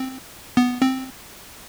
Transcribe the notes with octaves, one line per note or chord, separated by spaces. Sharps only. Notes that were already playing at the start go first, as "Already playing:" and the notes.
Already playing: C4
B3
C4